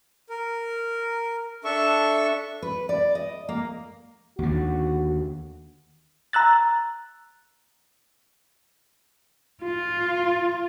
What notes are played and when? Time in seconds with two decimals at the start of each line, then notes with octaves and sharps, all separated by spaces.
0.29 A#4
1.64 D4 A4 E5 C#6
2.62 B4
2.89 D5
3.15 D#5
3.49 A#3
4.39 D#2 D3 F#4
6.33 A#5 E6 F#6 A6
9.64 F4